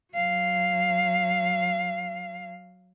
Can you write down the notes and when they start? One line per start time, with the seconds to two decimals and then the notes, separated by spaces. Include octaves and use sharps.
0.14 F#3 F5